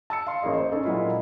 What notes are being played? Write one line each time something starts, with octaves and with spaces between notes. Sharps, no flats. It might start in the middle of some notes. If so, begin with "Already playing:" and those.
A5 E6 C#7
F5 C6
A1 A#3 G#4 D#5
C5
C#4 D#4 A4
A#2 F#3 G#3 E4 F4